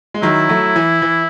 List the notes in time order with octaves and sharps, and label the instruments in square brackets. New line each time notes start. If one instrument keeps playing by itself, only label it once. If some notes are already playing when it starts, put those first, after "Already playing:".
[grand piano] G#3
[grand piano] D#3 F#3 [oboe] E4
[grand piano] F#3 A3
E3
E3